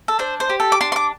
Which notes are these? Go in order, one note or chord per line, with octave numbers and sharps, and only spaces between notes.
A4
D4 C5
C5
G4
A4
D6
D4 C6
C6
D6